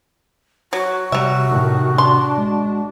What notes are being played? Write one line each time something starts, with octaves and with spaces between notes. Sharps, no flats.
F#3 F#4
C3 F#3 G3 E5
A2 D#3
D4 C6
G#3